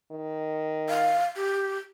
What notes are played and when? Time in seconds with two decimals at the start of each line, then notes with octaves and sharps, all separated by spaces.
0.12 D#3
0.89 F5
1.36 G4